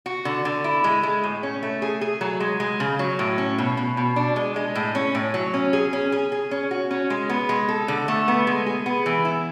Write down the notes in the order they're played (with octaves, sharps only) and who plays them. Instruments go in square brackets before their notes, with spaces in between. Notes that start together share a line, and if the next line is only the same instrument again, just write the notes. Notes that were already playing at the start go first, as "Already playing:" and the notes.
[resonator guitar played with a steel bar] F#4
D3
D3
E4
G#3
G#3
A2
C#4
A3
G#4
G#4
F#3
G#3
G#3
C#3
F#3
A2
C#4
B2
B2
B2
D4
G#3
G#3
A2
C#4
A2
F#3
C#4
G#4
C#4
G#4
G#4
C#4
F#4
C#4
G#3
B3
G#3
A4
D3
A3
B3
G#3
G#4
B3
E3
E4